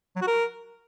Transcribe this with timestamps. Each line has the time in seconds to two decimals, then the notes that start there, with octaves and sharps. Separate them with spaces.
0.16 F#3
0.22 F#4
0.27 A#4